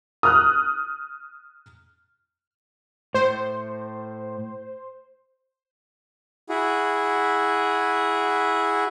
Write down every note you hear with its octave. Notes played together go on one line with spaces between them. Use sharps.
D#6 F6 F#6
A2 C5
E4 F#4 G#4